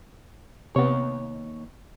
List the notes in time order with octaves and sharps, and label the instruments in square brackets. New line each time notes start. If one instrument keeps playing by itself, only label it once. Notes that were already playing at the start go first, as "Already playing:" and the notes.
[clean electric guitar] D#2 C#5 [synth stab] C3 B3